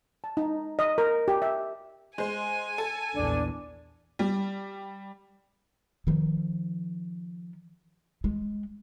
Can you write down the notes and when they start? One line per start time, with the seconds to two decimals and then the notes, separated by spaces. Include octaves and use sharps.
0.24 A5
0.37 D#4
0.79 D#5
0.98 A#4
1.28 G4
1.42 E5
2.18 G#3 C5 G#5
2.78 A4
3.14 A#1 E2 D4
4.19 G3
6.07 D#3 F3
8.24 G#3